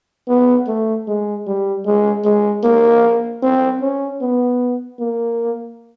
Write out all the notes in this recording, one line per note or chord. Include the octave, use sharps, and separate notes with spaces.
B3
A3
G#3
G3
G#3
G#3
A#3
C4
C#4
B3
A#3